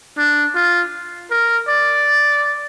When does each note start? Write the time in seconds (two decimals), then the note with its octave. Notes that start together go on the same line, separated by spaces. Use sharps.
0.18 D4
0.55 F4
1.31 A#4
1.69 D5